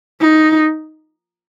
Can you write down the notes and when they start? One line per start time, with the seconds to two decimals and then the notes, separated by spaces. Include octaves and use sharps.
0.21 D#4